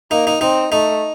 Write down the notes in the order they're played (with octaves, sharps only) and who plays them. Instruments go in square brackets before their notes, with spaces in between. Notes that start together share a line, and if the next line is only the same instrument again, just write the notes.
[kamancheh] A#3 [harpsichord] D#4
[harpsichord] D#4
[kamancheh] C4 [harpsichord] D#4
[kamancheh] A3 [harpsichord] D#4